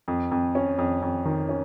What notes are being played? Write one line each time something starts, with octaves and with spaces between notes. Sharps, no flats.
F2
F2
C#4
F2
F2
D#3
C#4